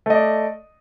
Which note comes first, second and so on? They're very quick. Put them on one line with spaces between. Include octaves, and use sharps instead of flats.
A3 D#5 D5